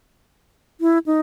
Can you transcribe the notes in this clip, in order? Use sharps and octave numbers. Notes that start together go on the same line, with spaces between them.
E4
D#4